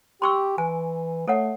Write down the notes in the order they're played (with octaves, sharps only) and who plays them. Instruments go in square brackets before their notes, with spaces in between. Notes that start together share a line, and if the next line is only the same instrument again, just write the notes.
[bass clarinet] G4 [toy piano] C6 C#6 E6
[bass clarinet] E3 [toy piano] G#5
[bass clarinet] A3 [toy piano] A4 C#5 F#5